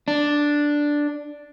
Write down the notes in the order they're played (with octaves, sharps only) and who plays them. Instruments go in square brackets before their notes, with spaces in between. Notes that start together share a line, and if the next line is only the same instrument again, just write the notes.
[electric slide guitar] D4